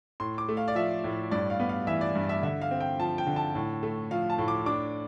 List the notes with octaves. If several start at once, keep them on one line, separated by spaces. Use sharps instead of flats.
A2 C6
D6
A3
F5
D5
F3 E5
A2
G2 D5
F5
B3
F5
E3 E5
D5
G2
E5
D3 E5
F5
C4
G5
F3 A5
G5
D3
A5
A2
A3
F3 F5
A5
A2
D6
D4 D6